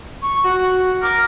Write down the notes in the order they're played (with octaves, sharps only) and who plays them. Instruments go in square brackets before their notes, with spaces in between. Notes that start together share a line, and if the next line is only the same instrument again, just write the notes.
[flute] C#6
F#4
[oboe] A#4 [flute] D6